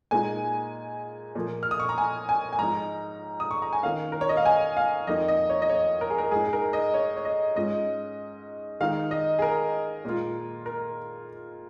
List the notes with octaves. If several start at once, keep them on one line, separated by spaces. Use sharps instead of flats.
A#2 G#3 D#4 G#5
A#2 F3 A#3
F6
D#6
C#6
A#5
G#5
G#5
G#5
G#2 F3 G#3 D#4 A#5
D#6
C#6
A#5
G#5
D#3 A#3 C#4 F5
A#4
C#5
D#5
F5
G#5
F5
F2 F3 A#3 D#4 D#5
D#5
C#5
D#5
C#5
A#4
G#4
A#4
G#2 G#3 D#4 G#4
G#4
A#4
D#5
C#5
C#5
D#5
G#2 G#3 C#4 F4 D#5
D#3 G#3 D#4 F5
D#5
G#4
A#4
A#2 G#3 F4
A#4